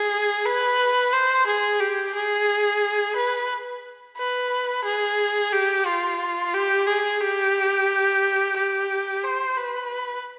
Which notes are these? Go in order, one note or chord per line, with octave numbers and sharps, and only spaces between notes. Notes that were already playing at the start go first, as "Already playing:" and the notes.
Already playing: G#4
B4
C5
G#4
G4
G#4
B4
B4
G#4
G4
F4
G4
G#4
G4
G4
C5
B4